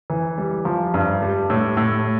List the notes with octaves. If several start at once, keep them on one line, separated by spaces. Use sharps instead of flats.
E3
G3
F3
G2
G3
A2
A2